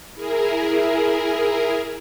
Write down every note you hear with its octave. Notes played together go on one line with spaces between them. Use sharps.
E4 G#4 A#4